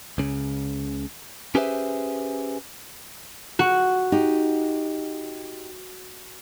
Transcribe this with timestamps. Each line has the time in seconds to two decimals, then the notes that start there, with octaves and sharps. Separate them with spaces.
0.18 C#2 C#3
1.55 C#4 G4 G#4 B4 C5 E5
3.59 F#4
4.12 D#4 G4